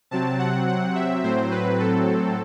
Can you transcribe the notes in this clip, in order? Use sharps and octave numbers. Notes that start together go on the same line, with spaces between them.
C3 F#3 C4 A5
F#5
F#5
E5
A2 F#3 C4 C5
B4
A4